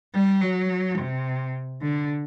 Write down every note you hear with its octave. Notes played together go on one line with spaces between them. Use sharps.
G3
F#3
C3
D3